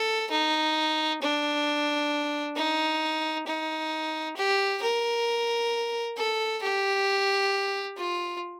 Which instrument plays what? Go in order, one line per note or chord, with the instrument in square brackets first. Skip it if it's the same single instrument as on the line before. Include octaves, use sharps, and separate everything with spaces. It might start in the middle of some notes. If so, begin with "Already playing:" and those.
Already playing: [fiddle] A4
D#4
D4
D#4
D#4
G4
A#4
A4
G4
F4